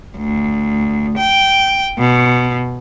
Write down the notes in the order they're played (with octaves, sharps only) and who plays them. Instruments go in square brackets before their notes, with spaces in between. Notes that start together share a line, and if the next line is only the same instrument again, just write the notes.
[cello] D2
G5
B2